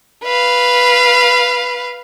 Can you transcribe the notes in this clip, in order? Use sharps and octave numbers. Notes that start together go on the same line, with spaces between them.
B4 F5